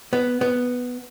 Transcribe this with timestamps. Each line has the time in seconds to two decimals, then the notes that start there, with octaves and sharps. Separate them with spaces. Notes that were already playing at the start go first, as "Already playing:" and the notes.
0.13 B3
0.41 B3